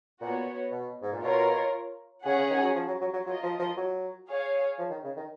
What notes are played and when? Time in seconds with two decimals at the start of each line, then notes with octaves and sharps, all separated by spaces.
0.21 A#2 B3 F#4 C#5
0.71 B2
1.02 G#2
1.13 A#2
1.23 B2 F4 A#4 C#5
2.25 C#3 C#4 G#4 C#5 F#5
2.37 C#3
2.50 D#3
2.62 F#3
2.75 F3
2.87 F#3
3.01 F#3
3.13 F#3
3.26 F#3 F4 A#4 D#5
3.43 F3
3.59 F3
3.77 F#3
4.27 G#4 C#5 F5
4.79 F3
4.90 D#3
5.04 C#3
5.17 D#3